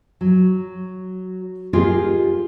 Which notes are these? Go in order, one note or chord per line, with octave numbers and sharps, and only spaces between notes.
F#3
F4 G4 G#4 A#4 D#5